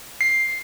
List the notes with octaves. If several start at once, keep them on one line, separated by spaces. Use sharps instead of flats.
C7